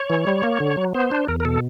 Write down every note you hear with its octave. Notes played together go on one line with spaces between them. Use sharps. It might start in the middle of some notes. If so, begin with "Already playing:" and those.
Already playing: C#5
E3
G3
A#3
D3
F#3
B3 C5
D4
E2 A#4
A#4
B2 A4